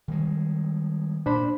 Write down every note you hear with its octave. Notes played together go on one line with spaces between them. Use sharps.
D#3 G3 G#3
A#2 D4 C5 B5